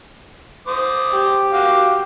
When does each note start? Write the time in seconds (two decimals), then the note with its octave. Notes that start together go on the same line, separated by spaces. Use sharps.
0.67 C5 D6 D#6
1.12 G4
1.53 F#4 F5 D6